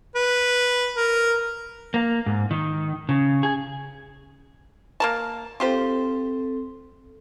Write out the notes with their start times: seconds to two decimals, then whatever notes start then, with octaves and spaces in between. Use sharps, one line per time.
0.15 B4
0.96 A#4
1.94 A#3
2.26 G#2
2.51 D#3
3.09 C#3
3.43 G#4
5.00 A#3 A#4 A5
5.60 C4 F4 G4 A4 C5